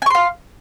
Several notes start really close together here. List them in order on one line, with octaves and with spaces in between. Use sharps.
G#5 C#6 C6 F5